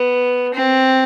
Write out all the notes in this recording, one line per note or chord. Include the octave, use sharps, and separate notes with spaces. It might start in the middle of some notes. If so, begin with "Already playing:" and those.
Already playing: B3
C4